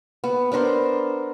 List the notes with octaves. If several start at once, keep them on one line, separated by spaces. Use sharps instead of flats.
B3
B3 D4 A#4 C5